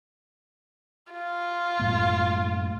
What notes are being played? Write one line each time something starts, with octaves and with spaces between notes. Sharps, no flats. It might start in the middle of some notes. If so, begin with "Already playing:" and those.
F4
F#2 A2 A#3